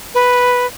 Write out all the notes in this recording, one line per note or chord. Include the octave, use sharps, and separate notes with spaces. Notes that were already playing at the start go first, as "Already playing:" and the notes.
B4